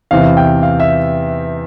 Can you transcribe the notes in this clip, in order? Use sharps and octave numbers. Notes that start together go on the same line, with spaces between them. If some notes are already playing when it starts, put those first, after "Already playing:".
E2 C3 E3 F5
G5
F5
E5